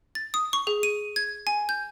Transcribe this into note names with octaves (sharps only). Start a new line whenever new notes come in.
A6
D#6
C#6
G#4
D#7
G#6
G#5
G6